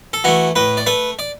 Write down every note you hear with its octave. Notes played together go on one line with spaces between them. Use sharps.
A4
E3 A3 F#4
A2 B4
D5
A3 B4
D5